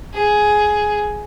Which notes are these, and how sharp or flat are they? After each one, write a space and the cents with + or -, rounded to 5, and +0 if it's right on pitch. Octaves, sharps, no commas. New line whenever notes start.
G#4 +10